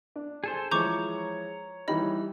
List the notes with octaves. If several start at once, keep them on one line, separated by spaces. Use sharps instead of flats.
D4
G#4 A4 C5
E3 F3 G#3 C#5 A#5 C#6 D6 G6
E3 G3 D#4 D#5 B5